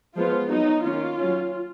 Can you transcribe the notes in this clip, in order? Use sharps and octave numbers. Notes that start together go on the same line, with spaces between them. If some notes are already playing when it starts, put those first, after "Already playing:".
F3 G#3 B3 F4
F#3 B3 D#4
D#3 A#3 C#4 F4
F#3 C#4